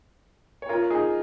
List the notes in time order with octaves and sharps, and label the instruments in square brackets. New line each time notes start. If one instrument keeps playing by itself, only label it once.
[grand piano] C#5
F4 A#4
D#4 G#4